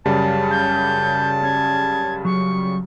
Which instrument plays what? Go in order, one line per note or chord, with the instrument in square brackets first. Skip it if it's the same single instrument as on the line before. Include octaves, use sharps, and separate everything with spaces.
[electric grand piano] F#2 C#3 G3 [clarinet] A5
[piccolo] G6
[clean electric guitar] C#4 [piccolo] G#6
[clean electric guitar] F#3 [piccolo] C#6